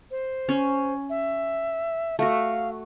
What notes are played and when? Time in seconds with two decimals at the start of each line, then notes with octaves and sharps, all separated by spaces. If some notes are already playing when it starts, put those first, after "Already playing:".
0.11 C5
0.49 C#4
1.10 E5
2.19 A3 F#4 F5